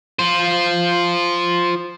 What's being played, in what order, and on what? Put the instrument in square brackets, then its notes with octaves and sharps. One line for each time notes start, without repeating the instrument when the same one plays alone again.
[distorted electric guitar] F4 C5